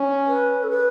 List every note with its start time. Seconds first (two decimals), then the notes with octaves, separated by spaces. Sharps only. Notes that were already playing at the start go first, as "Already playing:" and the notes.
Already playing: C#4
0.27 B4
0.64 A4
0.70 B4